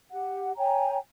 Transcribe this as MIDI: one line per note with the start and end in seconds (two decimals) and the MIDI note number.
0.10 0.51 67
0.10 0.51 78
0.57 0.97 73
0.57 0.97 79
0.57 0.97 80
0.57 0.97 82